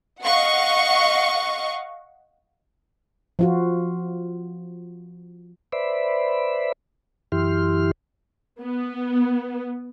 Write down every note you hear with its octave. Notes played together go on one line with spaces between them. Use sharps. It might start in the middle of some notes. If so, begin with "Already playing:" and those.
D#5 F5 F#5 C#6
F3 F4 F#4
B4 C5 D5 E5 B5
F#2 E3 E4 G4 C6 F6
B3